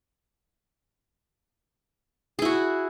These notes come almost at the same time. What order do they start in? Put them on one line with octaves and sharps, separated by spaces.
G#4 E4 F#4